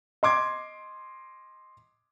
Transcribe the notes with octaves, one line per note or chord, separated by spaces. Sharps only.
D#5 C6 D6 G#6